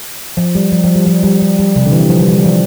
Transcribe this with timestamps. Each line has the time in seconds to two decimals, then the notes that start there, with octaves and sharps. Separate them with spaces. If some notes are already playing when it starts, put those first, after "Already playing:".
0.37 F3
0.55 G3
0.72 F3
0.84 F3
0.95 G3
1.06 F3
1.23 G3
1.41 G3
1.59 G3
1.76 C3
1.86 D3
1.92 E3
2.09 F3
2.21 G3
2.32 G3
2.45 F3